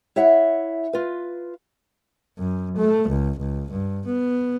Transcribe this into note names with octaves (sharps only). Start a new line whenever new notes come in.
E4 C#5 E5 F#5
F4 B4
F#2
A3
C#2
C#2
G2
B3